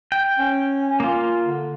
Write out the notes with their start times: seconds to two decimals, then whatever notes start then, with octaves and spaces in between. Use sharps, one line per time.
0.12 G5
0.38 C#4
1.00 A#3 F4
1.45 D3